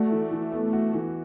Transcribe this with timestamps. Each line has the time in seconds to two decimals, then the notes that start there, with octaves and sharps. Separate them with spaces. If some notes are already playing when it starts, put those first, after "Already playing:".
Already playing: A3 F#4 D5
0.11 E3
0.31 E3
0.52 B3
0.73 F#4
0.94 E3